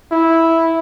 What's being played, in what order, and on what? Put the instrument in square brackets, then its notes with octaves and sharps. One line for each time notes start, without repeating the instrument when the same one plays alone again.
[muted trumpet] E4